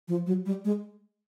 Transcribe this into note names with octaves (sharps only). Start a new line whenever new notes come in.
F3
F#3
G3
G#3